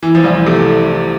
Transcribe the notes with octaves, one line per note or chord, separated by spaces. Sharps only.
E3
F3
C2 E3
C3 A3